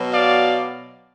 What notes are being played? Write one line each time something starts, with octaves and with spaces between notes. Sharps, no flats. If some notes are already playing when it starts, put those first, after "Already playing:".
Already playing: B2 F#3
D5 F5